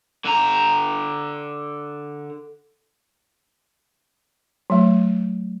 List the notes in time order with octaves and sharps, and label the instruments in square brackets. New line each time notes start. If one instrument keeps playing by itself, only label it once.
[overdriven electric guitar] D3 A#5
[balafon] F#3 A3